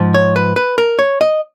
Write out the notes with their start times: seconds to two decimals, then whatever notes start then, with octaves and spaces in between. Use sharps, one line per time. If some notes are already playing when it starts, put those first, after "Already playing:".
Already playing: G#2 F3
0.14 C#5
0.36 B4
0.56 B4
0.78 A#4
0.99 C#5
1.21 D#5